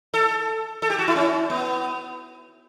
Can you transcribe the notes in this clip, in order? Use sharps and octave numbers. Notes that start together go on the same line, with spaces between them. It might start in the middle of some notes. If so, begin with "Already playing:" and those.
A4
A4
G4
F#4
E4
C#4
B3